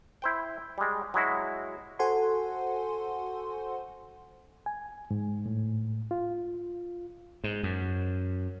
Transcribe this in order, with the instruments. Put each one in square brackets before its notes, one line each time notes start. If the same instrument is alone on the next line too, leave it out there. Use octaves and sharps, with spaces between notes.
[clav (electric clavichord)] E4 C5 G5
G3 G#3
F#3 G#3 E4 F#4
[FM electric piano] F#4 A4 C5 F#5 G#5 C6
[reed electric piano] G#5
G#2
A2
F4
[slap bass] G#2
F#2